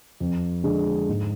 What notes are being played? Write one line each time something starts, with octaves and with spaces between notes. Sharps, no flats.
F2
D3 G#3 D4
G#2